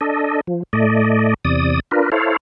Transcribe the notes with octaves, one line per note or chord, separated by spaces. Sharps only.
D4 A4 D#5
F3
A2 A3 D5 D#5
E2 C3 D5 D#6
D4 F4 A#4 B4
E4 A4 C5 C#5 F5